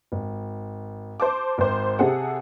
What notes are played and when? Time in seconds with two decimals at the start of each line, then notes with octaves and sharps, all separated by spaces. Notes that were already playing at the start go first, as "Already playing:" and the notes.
0.12 G#1
1.20 C5 A5 D6
1.58 G#1 C5
1.99 C3 C4 G#4 A4 F#5